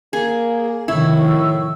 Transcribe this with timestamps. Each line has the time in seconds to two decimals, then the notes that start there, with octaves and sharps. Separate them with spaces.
0.13 A#3 G#4
0.88 A2 C3 D#3 F3 E4 C#6 E6